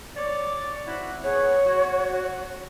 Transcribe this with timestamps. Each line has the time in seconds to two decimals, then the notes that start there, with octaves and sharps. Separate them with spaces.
0.15 C#5 D5
0.87 C4 E4 F#4
1.24 B3 G#4 C#5 F#5
1.64 F#4